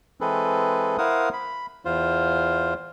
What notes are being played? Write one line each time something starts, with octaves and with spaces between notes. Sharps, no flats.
E3 G#3 C4 G#4 A4 B4
E4 A#4 C5 F5 F#5 D#6
B5
E2 F4 C5